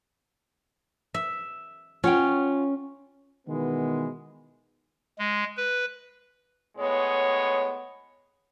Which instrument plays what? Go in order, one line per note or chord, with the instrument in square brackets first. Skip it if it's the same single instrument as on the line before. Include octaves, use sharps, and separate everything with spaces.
[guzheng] E5
[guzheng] C#4 [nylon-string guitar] F4 F#5 G5
[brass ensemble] B2 D#3 E3 G#3 B3
[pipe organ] G#3
B4
[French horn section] A2 G#3 B3 C#5